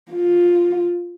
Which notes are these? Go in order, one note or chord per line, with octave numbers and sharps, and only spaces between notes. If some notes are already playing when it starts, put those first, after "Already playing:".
F4